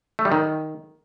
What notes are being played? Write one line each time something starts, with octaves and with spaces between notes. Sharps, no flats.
A3
G3
D#3